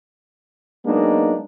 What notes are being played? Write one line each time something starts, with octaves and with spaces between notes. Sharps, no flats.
F#3 G#3 A#3 B3 D4 D#4